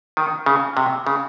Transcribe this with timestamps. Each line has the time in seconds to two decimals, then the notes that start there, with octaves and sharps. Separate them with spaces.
0.17 D#3
0.46 C#3
0.77 C3
1.07 C#3